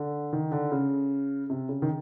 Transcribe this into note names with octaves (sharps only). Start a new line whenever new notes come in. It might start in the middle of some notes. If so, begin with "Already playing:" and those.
Already playing: D3
D#3
D3
C#3
C3
C#3
D#3